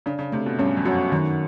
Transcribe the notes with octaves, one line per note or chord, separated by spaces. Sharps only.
C#3 D4
C#3
C3 A3
B2
G2 C#4
F2
F#2 F#4
F#2 D#3